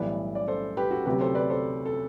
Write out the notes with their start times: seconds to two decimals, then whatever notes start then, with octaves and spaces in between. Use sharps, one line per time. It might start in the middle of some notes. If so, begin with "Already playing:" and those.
Already playing: B1 A2 E3 G3 B4 D5
0.35 D5
0.48 A4 C5
0.77 G4 B4
0.91 F#4 A4
1.06 D2 C3 F#3 G4 B4
1.21 A4 C5
1.35 B4 D5
1.50 A4 C5
1.86 A4